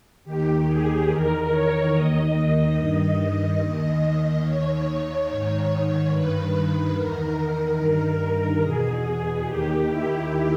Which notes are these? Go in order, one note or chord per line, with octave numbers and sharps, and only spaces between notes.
D#2 D#3 G4
G#4
E2 D#3 A#4
C#5
D#2 D#3 D#5
D#5
G2 D#3 D#5
D#2 D#3
D#2 D#3 C#5
G#2 D#3
G2 D#3 B4
B4
E2 D#3 A#4
G2 D#3
E2 B2 G#4
D#2 D#3 G4
E4